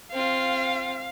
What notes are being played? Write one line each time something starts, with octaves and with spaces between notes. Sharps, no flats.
C4 F4 F5